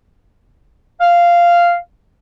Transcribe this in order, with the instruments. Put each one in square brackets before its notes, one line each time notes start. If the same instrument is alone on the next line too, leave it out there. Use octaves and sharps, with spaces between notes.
[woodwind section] F5